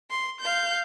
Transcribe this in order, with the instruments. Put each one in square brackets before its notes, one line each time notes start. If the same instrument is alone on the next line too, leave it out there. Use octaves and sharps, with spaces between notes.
[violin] C6
F5 G6